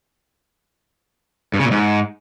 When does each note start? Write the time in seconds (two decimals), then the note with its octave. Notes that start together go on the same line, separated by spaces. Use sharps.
1.54 G2
1.59 C#3
1.65 A#2
1.71 G#2